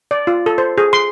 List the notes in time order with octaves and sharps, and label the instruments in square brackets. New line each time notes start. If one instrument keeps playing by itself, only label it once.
[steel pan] D5
F4
A4
C5
G#4
C6